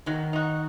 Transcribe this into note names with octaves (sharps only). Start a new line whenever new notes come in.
D#3 F#3
D#4 F#4